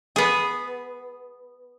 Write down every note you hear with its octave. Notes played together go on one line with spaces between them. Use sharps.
B3 G#4